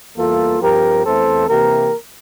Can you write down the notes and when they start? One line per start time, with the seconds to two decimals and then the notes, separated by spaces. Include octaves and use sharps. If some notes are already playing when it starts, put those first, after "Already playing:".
0.17 E2 E3 G3 A#3 F4 A4
0.61 G2 F3 C4 G4 A#4
1.04 E2 E3 A3 C4 A4 C5
1.48 C3 E3 A#3 G4 A#4